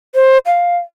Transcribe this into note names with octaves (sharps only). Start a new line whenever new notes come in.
C5
F5